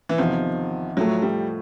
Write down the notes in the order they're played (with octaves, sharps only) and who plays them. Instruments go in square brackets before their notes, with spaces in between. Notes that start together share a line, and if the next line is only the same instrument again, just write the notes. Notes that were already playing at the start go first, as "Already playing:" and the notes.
[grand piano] E3
[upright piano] E2 C3 D#3 [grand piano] F3
[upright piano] A2 F3 A3 [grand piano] F#3
[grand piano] G3